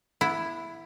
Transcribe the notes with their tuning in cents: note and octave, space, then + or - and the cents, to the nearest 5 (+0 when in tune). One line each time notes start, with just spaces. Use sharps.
B3 -20 E4 +5